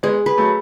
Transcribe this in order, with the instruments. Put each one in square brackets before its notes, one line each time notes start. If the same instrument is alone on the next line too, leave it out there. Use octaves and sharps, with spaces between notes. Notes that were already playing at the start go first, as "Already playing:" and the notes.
[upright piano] G#3 B3 [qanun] G#4
[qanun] B4
[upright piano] F#3 A3